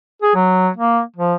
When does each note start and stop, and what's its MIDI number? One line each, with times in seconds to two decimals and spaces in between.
0.22 0.34 68
0.35 0.70 54
0.77 1.01 58
1.16 1.36 53